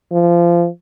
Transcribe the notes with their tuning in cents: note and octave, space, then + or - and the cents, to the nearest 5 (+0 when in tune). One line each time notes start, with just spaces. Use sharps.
F3 -25